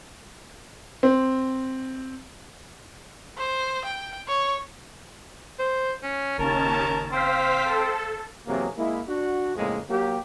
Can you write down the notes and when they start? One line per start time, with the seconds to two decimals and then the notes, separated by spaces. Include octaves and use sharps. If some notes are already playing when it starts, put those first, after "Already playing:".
1.03 C4
3.37 C5
3.85 G5
4.28 C#5
5.59 C5
6.03 C#4
6.38 F#1 D#2 C#4 A#4 A5
7.12 C4 C5 F5 B6
7.65 A4
8.47 E2 C3 F#3 A#3 G#4
8.78 G#3 A#3 E4
9.09 D4 F#4
9.56 F2 A2 C#3 G#3 A#3
9.90 F#3 A#3 G4